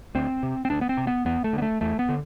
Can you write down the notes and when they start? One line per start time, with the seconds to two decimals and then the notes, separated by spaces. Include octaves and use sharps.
0.15 D2 C4
0.43 C3
0.65 C4
0.70 D2 D4
0.81 B3
0.89 C4
0.97 C3
1.07 B3
1.25 E2 B3
1.44 A3
1.53 D3 B3
1.62 A3
1.81 E2 A3
1.99 B3
2.09 D3